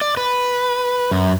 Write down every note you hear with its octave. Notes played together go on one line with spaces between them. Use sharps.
D5
B4
F#2